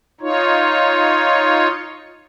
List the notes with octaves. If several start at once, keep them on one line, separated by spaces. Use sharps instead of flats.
D#4 F4 C#5